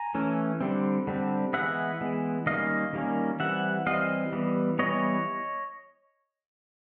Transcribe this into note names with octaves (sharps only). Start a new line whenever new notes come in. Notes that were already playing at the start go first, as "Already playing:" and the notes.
Already playing: G#5 A#5
E3 A3 C#4
D3 G3 C4
D3 G3 C4
E3 G#3 B3 E5 F#5
E3 G#3 B3
D#3 G3 A#3 C#4 D#5 F5
D#3 G3 A#3 C#4
E3 G3 C4 E5 F#5
E3 G3 C4 D#5 F5
E3 G3 B3
E3 G3 B3 C#5 D#5